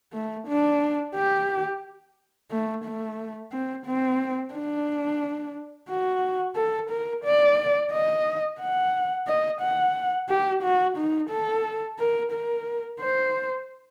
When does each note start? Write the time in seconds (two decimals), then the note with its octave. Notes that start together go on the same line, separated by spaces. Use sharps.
0.13 A3
0.47 D4
1.15 G4
2.51 A3
2.84 A3
3.52 C4
3.86 C4
4.54 D4
5.89 F#4
6.56 A4
6.90 A#4
7.25 D5
7.92 D#5
8.60 F#5
9.27 D#5
9.61 F#5
10.29 G4
10.63 F#4
10.97 D#4
11.30 A4
11.99 A#4
12.32 A#4
13.00 C5